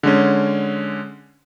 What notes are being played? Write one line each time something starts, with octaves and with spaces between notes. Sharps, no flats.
D3 G#3 C#4